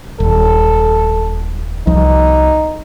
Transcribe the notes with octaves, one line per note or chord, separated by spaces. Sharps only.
D#1 A4
C2 F3 D#4